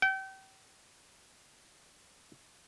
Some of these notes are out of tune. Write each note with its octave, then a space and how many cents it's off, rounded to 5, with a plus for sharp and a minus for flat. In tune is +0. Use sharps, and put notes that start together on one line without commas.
G5 -35